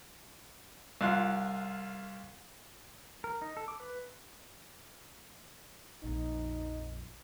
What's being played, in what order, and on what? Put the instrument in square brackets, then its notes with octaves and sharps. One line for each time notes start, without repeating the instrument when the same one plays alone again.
[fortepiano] C2 F4 F#6
[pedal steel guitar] A#4
D#4
A4
D6
B4
[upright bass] A#1 F2 [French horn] D#4